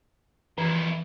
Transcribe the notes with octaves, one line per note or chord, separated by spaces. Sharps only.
F2 E3 E4